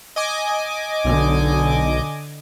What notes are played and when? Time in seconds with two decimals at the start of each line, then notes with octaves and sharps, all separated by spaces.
0.16 D#5 G#5 D6
1.05 B1 D3